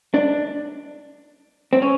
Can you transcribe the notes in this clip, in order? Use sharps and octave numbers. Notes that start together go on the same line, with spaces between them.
D4
C4
C#4